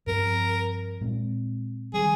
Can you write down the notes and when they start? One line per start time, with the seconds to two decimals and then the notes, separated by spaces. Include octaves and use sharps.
0.07 G2 F3 C4 A#4
1.01 A#2 G#3 C4
1.94 D#3 G3 G#4